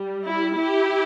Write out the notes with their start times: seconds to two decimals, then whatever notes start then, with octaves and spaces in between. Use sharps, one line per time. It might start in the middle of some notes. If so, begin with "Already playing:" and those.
Already playing: G3
0.27 E4
0.59 E4 G4